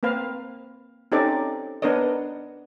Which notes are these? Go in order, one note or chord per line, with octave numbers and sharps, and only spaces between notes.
A#3 C4 B4 F5
C4 C#4 D#4 G4 A4 D5
B3 D4 A#4 C#5 D#5